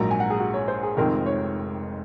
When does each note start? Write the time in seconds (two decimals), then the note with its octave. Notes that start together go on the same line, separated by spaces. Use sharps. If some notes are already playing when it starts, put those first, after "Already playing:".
Already playing: A#1 G#2 F#3 A#3 A#5
0.11 G#5
0.20 F#5
0.30 G#4
0.40 F#4
0.54 C#5
0.68 C5
0.83 G#4
0.97 F1 F2 D#3 G#3 C4 A#4
1.26 C#5